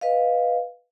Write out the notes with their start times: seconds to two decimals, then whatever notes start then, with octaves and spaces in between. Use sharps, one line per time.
0.01 B4 D#5 F5